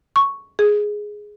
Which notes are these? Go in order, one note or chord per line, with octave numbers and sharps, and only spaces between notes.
C#6
G#4